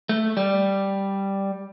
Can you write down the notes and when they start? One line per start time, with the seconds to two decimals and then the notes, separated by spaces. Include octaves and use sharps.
0.09 A3
0.37 G3